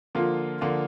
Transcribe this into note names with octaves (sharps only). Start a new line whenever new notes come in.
D3 F3 A#3 F4
D3 F3 A#3 F4